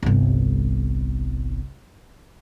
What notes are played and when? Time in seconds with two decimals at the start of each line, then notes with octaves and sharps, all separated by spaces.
0.03 G1 C2